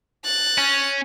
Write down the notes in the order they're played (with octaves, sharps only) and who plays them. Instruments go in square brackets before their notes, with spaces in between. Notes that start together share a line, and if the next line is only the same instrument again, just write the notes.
[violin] F#6 A6
[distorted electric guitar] C#4